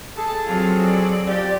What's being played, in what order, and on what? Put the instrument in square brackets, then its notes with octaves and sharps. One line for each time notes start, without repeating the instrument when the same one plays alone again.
[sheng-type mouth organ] G#4 A4 [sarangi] A5
[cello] F#3 C4 [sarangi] F4
[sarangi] D5
[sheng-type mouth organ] F4 [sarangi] G4 [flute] D5